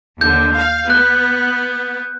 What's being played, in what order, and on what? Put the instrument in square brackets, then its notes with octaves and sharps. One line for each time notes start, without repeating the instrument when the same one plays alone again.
[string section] D#2 D3 [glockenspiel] G6
[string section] F5
[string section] B3 [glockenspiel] F#6